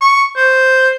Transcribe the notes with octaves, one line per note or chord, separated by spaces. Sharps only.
C#6
C5